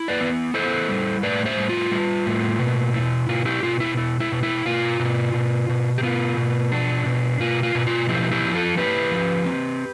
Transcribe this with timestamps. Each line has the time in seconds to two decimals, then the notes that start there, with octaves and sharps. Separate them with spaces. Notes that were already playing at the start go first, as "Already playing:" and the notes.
Already playing: E4
0.08 B4 D5
0.21 B3
0.54 E4 A4 C5
0.89 G3
1.23 A2 B4 D5
1.46 C5 E5
1.57 G3
1.69 F4
1.91 G3
2.26 A2
2.60 B2
2.94 E4
3.29 B2 F4
3.45 E4 G4
3.63 B2 F4
3.80 E4
3.97 E4
4.20 E4
4.32 B2
4.43 E4
4.65 B2 F4
5.00 B2
5.34 B2
5.69 B2
5.98 G4
6.03 B3 F4
6.37 B2
6.72 D4
7.06 B2
7.40 B2 F4
7.63 F4
7.75 B2
7.87 F4
8.09 F3 E4 G4
8.32 E4 G4
8.44 F3
8.55 F4 A4
8.77 E4 G4 B4
9.11 F3
9.46 C4